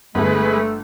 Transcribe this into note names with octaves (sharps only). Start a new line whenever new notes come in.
G1 G#3 A3 B4